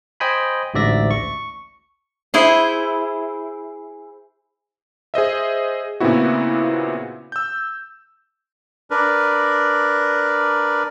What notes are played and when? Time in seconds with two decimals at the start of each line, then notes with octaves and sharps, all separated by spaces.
0.20 C5 D#5 G5 G#5 B5
0.74 A1 D2 G#2 D5 E5 A#6
1.11 C#6
2.34 E4 G#4 C5
5.14 G#4 C5 D#5 E5
6.00 A#2 C#3 B3 C4 E4 F#4
7.32 E6 G6
8.91 D4 A#4 B4